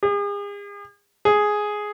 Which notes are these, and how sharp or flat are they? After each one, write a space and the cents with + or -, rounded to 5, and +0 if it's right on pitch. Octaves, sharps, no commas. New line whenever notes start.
G#4 -40
G#4 +5